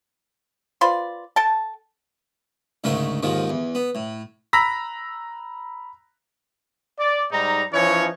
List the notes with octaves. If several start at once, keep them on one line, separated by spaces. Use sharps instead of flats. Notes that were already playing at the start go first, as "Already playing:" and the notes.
F4 B4 C5 D5
A4 G5 A5
D2 G#2 C#3 A3 A#4
D#2 G#2 D#3 F3
E2
B3
A2
A#5 B5 E6 A#6 B6
D5
G#2 G3 D#4 A#5
E3 F3 C#4 D#4 C#5